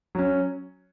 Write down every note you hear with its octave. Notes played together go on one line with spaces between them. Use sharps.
F#3 C#4